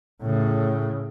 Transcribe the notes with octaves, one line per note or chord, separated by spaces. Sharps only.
A2 C#3